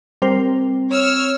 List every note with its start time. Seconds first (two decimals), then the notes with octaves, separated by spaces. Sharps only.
0.22 G3 C4 A#4 C5
0.89 C#5 E6 F6